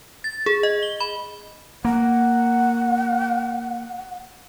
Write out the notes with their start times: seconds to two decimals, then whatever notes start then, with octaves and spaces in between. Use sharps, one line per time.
0.24 A6
0.46 G#4
0.63 D#5
0.83 G7
1.00 B5
1.85 A#3 F#5